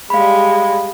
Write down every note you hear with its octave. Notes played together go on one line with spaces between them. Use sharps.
G3 G#3 F5 B5